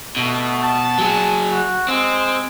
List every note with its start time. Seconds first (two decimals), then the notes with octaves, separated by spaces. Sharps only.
0.16 B2 A3
0.62 A5
0.98 F#3 G#4
1.51 F#4
1.88 G#3 C4